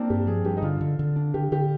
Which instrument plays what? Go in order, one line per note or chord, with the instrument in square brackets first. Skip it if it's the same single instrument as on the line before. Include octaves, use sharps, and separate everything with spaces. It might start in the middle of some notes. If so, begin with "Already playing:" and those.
Already playing: [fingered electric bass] A#3 [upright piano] C4 D4 F4
[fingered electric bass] G2 [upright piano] G4
[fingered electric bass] F3 [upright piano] G#4
[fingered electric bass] G2 [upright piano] G4
[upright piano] D#4
[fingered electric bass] D3 [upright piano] F4
[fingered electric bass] D3
D3
D4
[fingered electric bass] D3 [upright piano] G4
[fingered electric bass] D3 [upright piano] G4